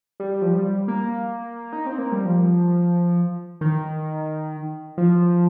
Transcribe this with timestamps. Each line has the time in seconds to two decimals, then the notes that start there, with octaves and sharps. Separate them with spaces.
0.20 G3
0.42 F3
0.53 G3
0.88 A#3
1.73 D#4
1.87 C4
1.98 A#3
2.12 G3
2.25 F3
3.61 D#3
4.98 F3